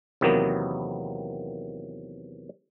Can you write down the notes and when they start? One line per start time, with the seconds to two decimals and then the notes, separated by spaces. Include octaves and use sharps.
0.21 E2 C3 D#3 F#3 A#3 B3